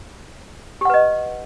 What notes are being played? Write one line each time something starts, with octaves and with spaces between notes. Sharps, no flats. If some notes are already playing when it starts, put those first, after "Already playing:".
G4 B4 D#5 F#5